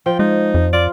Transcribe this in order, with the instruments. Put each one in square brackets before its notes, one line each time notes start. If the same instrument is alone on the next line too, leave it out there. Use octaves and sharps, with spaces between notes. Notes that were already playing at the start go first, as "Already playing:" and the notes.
[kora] F3 [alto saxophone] G5
[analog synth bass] G#3 [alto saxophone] D#4
[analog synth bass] F2
[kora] F4 [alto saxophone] D5